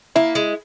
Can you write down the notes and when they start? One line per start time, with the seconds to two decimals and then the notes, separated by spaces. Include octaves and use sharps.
0.15 A#3 E4
0.35 G#3